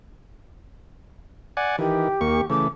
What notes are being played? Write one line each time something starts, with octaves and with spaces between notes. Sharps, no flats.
D5 F#5 G#5
D#3 E3 G4
D#2 A#3 C#6
C#3 E3 A3 D6